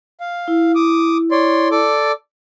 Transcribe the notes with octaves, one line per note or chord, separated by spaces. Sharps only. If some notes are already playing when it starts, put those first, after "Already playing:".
F5
E4
D6 D#6
C#5 D5 C6
A4 D5 D6